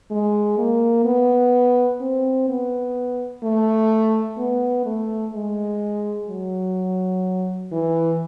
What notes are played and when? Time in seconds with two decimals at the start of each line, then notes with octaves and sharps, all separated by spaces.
0.11 G#3
0.58 A#3
1.05 B3
2.01 C4
2.49 B3
3.43 A3
4.38 B3
4.86 A3
5.34 G#3
6.29 F#3
7.72 E3